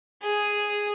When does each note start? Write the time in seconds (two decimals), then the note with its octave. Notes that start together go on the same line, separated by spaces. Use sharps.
0.22 G#4